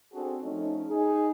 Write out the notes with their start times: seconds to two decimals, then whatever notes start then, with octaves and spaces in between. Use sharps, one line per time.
0.13 C4 D4 F#4 G#4 A4
0.42 F3 A3 C#4 D#4
0.87 D#4 G#4